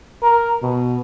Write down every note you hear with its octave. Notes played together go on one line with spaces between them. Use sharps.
A#4
B2